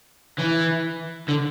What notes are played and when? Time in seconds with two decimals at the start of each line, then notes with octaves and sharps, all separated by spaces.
0.39 E3
1.28 D3